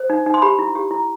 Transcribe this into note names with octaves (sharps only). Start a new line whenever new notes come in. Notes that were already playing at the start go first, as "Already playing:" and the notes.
Already playing: C5
D#4
D#4
C6
G4 B5
E4
G4
E4